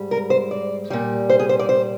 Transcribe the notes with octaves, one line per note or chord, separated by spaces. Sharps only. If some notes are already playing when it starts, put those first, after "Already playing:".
Already playing: G#2 G3
A#4
C5
D5
A#2 G3
C5
G#4
C5
D5
C5